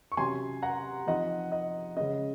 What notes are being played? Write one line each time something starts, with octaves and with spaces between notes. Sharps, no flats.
C#6
C3 F#3 C#4 G#5 C6
F#5 A#5
F3 C4 D#4 D#5 F#5
D#5
C#3 G#3 C#4 D#5